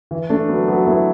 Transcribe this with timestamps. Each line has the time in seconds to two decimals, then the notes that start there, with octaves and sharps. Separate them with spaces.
0.11 E3
0.30 A3 D4
0.49 F#3 B3
0.68 F#3 B3
0.87 B3 E4